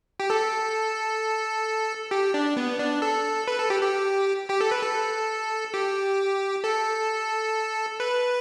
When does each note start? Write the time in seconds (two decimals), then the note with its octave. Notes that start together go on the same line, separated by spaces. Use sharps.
0.20 G4
0.30 A4
2.11 G4
2.34 D4
2.57 B3
2.79 D4
3.02 A4
3.48 B4
3.58 A4
3.70 G4
3.81 G4
4.50 G4
4.61 A4
4.71 B4
4.83 A4
5.74 G4
6.64 A4
8.00 B4